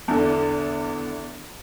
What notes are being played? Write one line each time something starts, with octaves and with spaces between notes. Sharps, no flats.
E2 D3